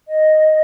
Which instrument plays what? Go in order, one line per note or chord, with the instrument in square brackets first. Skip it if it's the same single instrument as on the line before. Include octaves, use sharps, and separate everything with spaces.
[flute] D#5